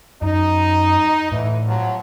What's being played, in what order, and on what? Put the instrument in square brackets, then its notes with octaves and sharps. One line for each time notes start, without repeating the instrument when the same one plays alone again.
[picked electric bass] F#2 [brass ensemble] D#4
[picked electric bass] A2 [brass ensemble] D3 E3
[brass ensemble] C3 F3 F#3